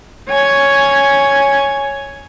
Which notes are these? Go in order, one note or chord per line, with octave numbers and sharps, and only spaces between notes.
C#5 G#5